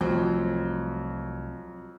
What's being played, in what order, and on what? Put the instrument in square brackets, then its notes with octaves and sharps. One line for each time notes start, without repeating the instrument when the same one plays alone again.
[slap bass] C2 A3 [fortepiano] F2 [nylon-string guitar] F#3 C5